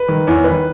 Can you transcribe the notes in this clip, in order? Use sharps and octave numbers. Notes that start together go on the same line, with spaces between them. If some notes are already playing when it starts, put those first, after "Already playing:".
Already playing: B4
D#3
E2 C#5
D#3 B4